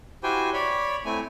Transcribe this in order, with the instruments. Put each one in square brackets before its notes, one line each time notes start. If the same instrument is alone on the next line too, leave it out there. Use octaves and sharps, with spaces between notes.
[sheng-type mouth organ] E4 F#4 G4 C5 G5 G#5
C#5 D5 B5
A3 C4 E4 G#5